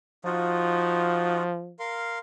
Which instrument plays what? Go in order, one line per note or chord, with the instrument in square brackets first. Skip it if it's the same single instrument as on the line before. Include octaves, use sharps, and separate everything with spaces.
[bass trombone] F3 [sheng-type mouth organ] D#4 F4 F#4
[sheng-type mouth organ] A#4 F5 C6